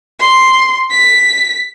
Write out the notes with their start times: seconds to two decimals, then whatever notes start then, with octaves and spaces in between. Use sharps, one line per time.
0.20 C6
0.91 B6